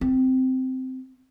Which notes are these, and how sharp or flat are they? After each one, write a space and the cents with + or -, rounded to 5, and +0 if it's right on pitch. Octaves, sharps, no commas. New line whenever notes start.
C4 -10